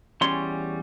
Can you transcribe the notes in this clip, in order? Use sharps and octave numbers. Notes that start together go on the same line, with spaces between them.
E2 G3 C#4 C#5 C6